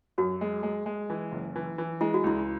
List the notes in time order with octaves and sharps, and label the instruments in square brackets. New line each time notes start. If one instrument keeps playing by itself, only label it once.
[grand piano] F#2 [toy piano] F#4
[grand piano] G#3
G#3
G#3
E3
F#1
E3
E3
[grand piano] G#3 [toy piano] E4
[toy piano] F#4
[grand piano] C#2 [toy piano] E4